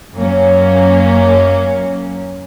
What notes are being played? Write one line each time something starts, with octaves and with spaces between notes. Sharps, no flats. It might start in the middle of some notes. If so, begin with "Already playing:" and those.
F#2 F#3 A#3 C#4